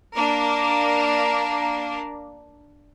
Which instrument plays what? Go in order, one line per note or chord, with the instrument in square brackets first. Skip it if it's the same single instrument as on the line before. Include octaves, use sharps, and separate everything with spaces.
[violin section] A#3 D4 A#4